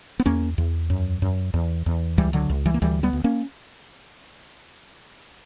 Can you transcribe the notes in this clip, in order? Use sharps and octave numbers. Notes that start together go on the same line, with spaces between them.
B3
E2 A#3 C#4
E2
F#2
F#2
E2
E2
C#2 E3 G3
D3 F#3
C#2
E3 G3
A#3
D2 E3 G3
G3 B3
D2
A#3 C#4